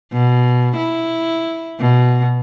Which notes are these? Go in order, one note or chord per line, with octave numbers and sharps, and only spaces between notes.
B2
E4
B2